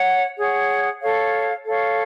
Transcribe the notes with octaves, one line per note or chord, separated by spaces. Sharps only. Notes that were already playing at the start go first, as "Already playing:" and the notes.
Already playing: C#5 F#5
G#4 C#5 F#5
A4 C#5 F5
A4 C#5 F5